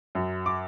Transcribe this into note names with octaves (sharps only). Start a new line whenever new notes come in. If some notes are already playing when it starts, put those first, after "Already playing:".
F#2
D6